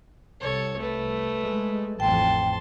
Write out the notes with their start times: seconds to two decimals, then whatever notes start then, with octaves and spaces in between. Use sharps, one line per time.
0.41 C2 A4 C#5
0.78 A3 B4
1.41 G#3
2.00 A1 F2 G5 A5 C6